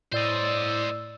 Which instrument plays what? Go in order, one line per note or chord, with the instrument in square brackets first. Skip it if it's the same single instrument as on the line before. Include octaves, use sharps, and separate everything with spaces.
[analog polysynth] A2 D5 E6 [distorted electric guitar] C5 D#5